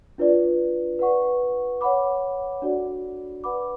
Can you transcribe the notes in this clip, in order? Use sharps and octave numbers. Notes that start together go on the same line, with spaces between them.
D4 F4 B4 D5
B4 F#5 C#6
C#5 F#5 B5 D6
D4 F#4 A4 D5
B4 F#5 B5 D6